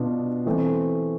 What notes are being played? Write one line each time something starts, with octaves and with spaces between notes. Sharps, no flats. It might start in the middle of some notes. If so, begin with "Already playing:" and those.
Already playing: B2 B3 D4 F4
E3 A3 C4